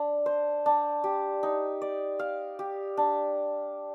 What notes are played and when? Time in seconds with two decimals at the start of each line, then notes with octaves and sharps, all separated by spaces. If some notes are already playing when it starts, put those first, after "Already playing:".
Already playing: D4
0.26 C5
0.66 D4
1.04 G4
1.43 D#4
1.81 D5
2.19 F5
2.59 G4
2.97 D4